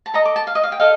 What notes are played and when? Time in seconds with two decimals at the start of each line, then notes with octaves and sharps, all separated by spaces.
0.06 A5
0.14 A4 D#5 A#5
0.25 D6
0.36 A5
0.47 F5
0.55 D#5
0.63 F5
0.72 G5
0.80 A4 D#5 F5